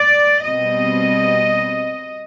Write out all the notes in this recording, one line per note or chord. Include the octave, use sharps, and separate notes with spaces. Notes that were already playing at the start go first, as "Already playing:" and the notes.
Already playing: D5
B2 G3 C4 D#5